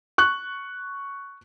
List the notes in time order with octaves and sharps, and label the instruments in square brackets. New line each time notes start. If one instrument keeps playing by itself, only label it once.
[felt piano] C#6 F#6